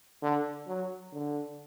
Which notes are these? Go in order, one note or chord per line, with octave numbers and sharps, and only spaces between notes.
D3
F#3
D3